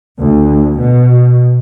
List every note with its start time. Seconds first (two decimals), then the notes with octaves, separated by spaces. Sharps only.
0.19 D2
0.81 B2